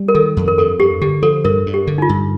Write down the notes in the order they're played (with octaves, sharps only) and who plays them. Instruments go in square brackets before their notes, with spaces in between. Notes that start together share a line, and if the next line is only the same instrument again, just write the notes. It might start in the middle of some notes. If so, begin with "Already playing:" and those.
Already playing: [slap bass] G3
[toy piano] A#4
[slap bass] D#3 [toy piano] A4
[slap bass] F2
[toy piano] A#4
[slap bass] G2 [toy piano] A4
[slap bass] G2 [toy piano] G4
[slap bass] D3 [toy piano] G4
[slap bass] F3 [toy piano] A4
[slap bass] G2 [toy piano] A#4
[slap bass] G2
[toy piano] G4
[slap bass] D3
[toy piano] D#4
F4
[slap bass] G2